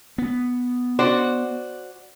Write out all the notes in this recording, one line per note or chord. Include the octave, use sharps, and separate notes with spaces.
B3
F#4 C5 D5